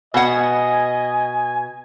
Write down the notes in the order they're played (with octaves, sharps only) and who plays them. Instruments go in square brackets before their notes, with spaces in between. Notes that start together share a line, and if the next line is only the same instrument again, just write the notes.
[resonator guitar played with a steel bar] B2 F#5 [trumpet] D#5 [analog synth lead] G#5